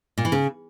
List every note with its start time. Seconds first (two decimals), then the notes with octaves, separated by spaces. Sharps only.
0.18 A#2
0.25 E3
0.32 C#3